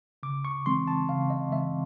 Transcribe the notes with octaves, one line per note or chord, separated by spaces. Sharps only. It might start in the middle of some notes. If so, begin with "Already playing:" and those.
C#3 D6
C#6
E3 G#3 C4 C6
A5
C#3 F5
D#5
E3 G#3 C4 E5